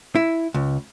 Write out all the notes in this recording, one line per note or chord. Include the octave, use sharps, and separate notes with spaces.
E4
C#2